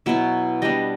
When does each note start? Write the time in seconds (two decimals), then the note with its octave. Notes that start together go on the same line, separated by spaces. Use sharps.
0.06 B2 F#3 B3 E4 E5
0.62 G3 B3 D4 D#5